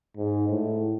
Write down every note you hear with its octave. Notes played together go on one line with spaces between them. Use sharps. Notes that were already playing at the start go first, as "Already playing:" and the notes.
G#2
A2